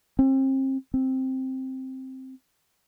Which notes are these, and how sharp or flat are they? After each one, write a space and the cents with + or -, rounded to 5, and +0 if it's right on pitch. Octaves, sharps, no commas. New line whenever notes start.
C4 +35
C4 +5